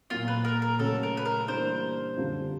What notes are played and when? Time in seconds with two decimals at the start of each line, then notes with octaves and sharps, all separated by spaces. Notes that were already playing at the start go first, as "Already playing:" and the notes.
0.10 A#2 F#3 A#3 F4
0.28 B4
0.45 A#4
0.62 A#4
0.79 C#3 F#3 A3 C#4 F#4 A4
1.03 A#4
1.17 B4
1.25 A#4
1.48 E3 G3 A#3 D4 C5
2.17 F#2 D3 G3 C4 F4